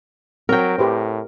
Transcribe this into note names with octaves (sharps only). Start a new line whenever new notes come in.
F#3 C4 A#4 G5
A2 G4 B4 C5